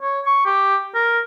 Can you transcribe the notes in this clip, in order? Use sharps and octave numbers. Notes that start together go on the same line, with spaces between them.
C#5
C#6
G4
A#4